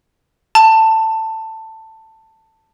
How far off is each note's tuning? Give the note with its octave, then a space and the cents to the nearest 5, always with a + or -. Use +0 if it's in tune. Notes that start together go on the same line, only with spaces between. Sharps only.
A5 +15